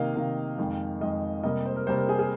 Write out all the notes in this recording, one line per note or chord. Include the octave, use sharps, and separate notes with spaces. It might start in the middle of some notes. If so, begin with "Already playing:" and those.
Already playing: C3 D#3 A#3 D#5 F5
C3 D#3 A#3 F5
F2 D#3 G#3
F2 D#3 G#3 D#5
C3 G3 A#3 D#5
C5
A#4
C3 G3 A#3 C5
A#4
G#4
G#4